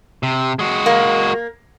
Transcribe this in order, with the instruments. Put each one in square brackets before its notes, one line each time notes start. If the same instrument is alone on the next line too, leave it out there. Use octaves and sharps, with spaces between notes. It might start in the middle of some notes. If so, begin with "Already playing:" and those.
[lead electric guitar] C3
G#3 F#4
[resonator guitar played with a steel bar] A#3